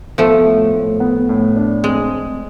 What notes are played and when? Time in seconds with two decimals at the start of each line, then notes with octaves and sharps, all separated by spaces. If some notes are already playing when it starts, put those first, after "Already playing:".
0.18 F3 A3 B3
0.45 A2
0.73 A2
1.00 B3
1.29 A2
1.56 D4
1.83 G#3 C4